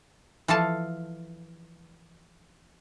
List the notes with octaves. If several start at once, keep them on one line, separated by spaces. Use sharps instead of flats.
E3 F3 A4 F5 A5